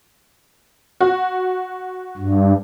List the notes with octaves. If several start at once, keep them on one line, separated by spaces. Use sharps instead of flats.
F#4
G2